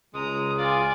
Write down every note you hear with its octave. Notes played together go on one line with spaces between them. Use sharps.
C#2 G#3 A#5 D#6
F4 D5 G#5